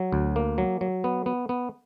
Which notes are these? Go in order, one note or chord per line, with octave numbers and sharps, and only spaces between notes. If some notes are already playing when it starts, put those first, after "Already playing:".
Already playing: F#3
D2
A#3
F#3
F#3
B3
B3
B3